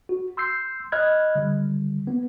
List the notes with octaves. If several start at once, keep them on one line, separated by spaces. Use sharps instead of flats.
F#4
C6 E6 G6 C7
D#5 B5 F6 F#6 G#6
D3 G3
B3